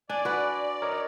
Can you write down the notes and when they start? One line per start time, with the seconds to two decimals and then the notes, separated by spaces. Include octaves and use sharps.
0.10 D4 D5 G#5
0.25 F#4 B4
0.82 A#4 C#5 D#5